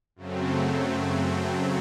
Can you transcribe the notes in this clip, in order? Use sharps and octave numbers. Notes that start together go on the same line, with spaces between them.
F#2 C#3 F#3 A3 C4